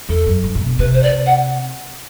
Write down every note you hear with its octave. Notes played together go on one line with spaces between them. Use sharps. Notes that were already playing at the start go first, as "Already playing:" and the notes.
E2 A4
F#2
G2
A2
B2
C3 B4
C5
D5
F#5